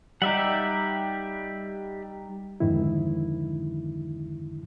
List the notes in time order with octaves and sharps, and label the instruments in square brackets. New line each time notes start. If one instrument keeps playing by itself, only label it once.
[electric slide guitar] G3 D#4 [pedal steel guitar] G4 E5 F#5
[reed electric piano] F2 G#2 D3 D#3 E4